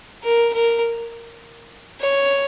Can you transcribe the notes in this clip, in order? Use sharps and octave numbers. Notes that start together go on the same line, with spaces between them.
A#4
A#4
C#5